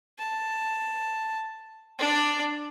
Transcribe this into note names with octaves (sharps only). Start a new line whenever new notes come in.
A5
D4 D5